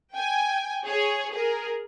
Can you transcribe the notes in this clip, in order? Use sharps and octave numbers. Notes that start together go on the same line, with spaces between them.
G5 G#5
G#4 C#5
G#4 A#4